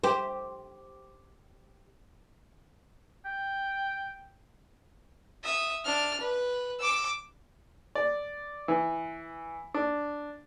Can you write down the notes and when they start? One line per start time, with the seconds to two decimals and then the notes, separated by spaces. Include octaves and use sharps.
0.04 G4 C5
3.25 G5
5.44 E5 D#6
5.84 D4 F6
6.21 B4
6.79 D6 E6
7.95 D5
8.68 E3
9.74 D4